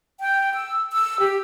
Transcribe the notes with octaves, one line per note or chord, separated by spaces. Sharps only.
G5
E6
E6
G4